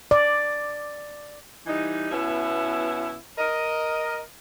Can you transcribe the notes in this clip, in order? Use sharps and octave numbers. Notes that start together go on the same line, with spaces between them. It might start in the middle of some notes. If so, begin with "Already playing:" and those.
D5
E3 G3 D#4
B2 B3 C#4 E4
A#4 D#5